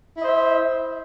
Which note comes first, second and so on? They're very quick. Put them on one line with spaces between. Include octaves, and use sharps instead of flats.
E4 D#5 C5 E5